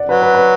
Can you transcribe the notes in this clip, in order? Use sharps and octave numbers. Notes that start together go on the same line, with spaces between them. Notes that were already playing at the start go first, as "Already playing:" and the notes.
Already playing: D5 F#5
F#3 B4
B4
B4